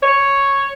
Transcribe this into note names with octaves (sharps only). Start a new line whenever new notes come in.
C#5